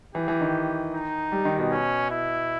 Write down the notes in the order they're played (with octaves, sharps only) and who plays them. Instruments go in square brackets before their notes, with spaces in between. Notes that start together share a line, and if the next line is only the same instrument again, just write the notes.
[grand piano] E3 [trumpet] G4
[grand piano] E3
D#3
[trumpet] D#4
[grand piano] G3
D#3
B2
[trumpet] C#4
E4